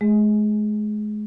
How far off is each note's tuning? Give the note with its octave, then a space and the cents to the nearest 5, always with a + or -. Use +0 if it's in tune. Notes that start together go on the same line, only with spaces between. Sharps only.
G#3 +35 G#4 -10